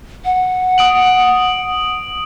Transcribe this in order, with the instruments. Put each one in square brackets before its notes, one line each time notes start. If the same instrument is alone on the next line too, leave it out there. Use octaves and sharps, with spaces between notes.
[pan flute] F#5
[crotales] D#6 D7 F#7